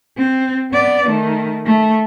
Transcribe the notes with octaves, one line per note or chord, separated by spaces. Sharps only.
C4
B3 D5
D#3 A3
A3